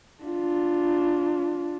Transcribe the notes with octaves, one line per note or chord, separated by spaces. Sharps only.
D4 F4